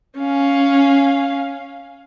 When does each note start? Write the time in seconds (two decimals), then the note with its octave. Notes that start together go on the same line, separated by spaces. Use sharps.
0.18 C#4 F5